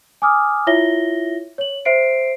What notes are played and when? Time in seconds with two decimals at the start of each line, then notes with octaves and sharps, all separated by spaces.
0.22 G#5 D6 D#6 F6
0.67 E4 F4 C#5 E5 A#6 G7
1.58 C#5 F#7
1.85 C5 E5 C7 D7